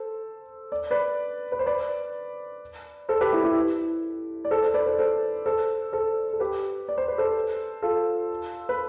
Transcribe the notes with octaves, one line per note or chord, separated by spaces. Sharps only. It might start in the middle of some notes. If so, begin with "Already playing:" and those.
Already playing: A4 C5
D5
B4 D5
B4
C5
B4 D5
A4 C5
G4 B4
E4
E4 G4
D5
A4 C5
A4 C5
B4 D5
A4 C5
A4 C5
A4 C5
A4 C5
A4
G4 B4
D5
C5
B4
A4 C5
F4 A4
B4